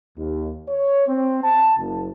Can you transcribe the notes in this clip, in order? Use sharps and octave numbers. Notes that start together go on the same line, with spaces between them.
D#2
C#5
C4
A5
F#1